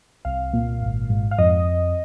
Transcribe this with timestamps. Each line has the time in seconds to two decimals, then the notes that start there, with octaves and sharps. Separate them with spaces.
0.25 C2 F5
0.53 A#2
0.81 G#1
1.10 G#2
1.31 F5
1.38 F2 D#5